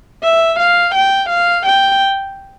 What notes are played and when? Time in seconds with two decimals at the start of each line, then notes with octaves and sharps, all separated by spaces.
0.23 E5
0.59 F5
0.94 G5
1.29 F5
1.66 G5